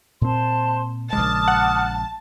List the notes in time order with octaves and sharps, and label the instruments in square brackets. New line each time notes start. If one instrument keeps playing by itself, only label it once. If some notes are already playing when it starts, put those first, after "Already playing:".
[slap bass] A#2 C4 [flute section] C5 A5 C6
[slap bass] A#1 C#3 G#3 [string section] A5 [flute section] D6 D#6 F6
[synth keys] F#5